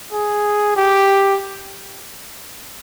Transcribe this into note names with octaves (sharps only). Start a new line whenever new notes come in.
G#4
G4